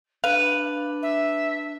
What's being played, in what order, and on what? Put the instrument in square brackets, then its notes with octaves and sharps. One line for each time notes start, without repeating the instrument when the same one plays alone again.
[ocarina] D4 [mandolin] B4 [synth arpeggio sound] F5
[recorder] E5